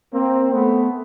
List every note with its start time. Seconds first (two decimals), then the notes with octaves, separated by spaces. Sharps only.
0.14 A#3 C4
0.52 A3 B3